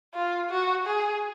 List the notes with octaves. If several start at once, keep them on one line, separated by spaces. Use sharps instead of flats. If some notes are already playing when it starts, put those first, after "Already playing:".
F4
F#4
G#4